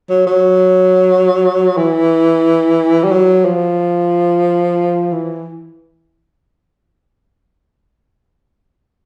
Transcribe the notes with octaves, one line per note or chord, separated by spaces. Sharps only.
F#3
F#3
E3
G3
F#3
F3
E3